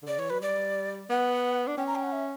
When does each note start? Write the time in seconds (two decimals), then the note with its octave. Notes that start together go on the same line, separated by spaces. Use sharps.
0.03 D3
0.07 C#3 D5
0.18 E3 C#5
0.30 F#3 B4
0.42 G3 D5
1.10 B3 F#5
1.68 D4
1.77 C#4 G5
1.87 A#5
1.95 G5
2.03 F#5
2.12 E5